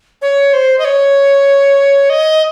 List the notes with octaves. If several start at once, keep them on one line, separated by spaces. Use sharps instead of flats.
C#5
C5
D#5
C#5
D#5